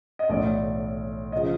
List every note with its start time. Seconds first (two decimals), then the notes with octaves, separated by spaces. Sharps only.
0.19 D#5
0.29 B1 A2 E3 A3 D5
1.32 C#3 F3 D#5